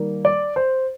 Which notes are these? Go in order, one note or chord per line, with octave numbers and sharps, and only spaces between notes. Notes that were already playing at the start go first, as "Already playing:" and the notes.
Already playing: D#3 G3 A#3
D5
C5